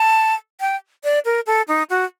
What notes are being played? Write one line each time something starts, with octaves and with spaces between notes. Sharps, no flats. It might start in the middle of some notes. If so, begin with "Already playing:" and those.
Already playing: A5
G5
D5
A#4
A4
D#4
F#4